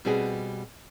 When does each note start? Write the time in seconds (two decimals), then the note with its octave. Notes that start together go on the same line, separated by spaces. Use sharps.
0.05 B2 G3 C4 F#4 G#4